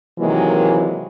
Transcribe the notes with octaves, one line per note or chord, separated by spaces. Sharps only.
C3 D#3 E3 F#3 G#3 A#3